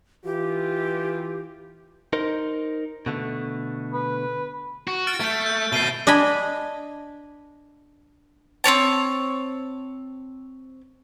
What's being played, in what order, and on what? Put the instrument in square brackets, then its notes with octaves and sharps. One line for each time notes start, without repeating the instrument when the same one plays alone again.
[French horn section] E3 F4 [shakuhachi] G4
[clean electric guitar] D#4 A#4 C5
B2 D3 A3
[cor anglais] B4
[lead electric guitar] F#4
[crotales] F6 A6 D7
[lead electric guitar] A3 [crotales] G6 D7
[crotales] G6
[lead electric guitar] B2 A3 [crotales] C7 D#7 G7
[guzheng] D4 D#5 G#5 B5
[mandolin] C4 C#4 C#5 A5